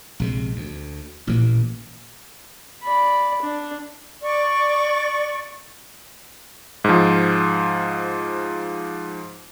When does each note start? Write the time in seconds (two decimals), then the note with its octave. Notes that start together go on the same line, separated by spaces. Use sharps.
0.20 A#1 C3 G#3
0.56 D2
1.27 A1 A#2 E3 A#3
2.83 D5 B5
3.42 D4
4.21 D5 C#6
6.84 G#2 F3